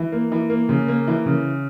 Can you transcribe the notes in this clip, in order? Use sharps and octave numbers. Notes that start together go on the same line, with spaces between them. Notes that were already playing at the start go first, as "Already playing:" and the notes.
Already playing: E3
A#3
E3
A#3
C#3
A#3
E3
C#3